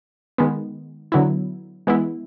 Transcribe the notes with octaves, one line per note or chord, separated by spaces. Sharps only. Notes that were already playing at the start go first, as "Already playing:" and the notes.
D#3 G#3 B3
D3 F#3 B3 E4
E3 G#3 B3 E4